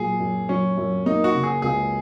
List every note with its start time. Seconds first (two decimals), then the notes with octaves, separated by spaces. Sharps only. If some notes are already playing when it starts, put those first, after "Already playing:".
Already playing: A#2 F#3 G#4
0.20 F#2
0.49 F#3 C#4
0.77 F#2
1.06 A#3 D#4
1.24 F#4
1.34 C#3
1.43 G#4
1.62 C#2 G#4